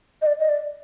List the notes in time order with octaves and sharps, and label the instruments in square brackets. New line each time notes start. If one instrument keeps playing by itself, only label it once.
[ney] D#5
D5
D#5
D5